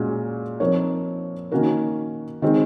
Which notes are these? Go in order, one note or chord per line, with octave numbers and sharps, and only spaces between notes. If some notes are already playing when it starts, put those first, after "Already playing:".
Already playing: A#2 G#3 C#4 F#4
F3 C4 D#4 A#4 C#5
D#3 A#3 C#4 F#4 A#4
D#3 G#3 C4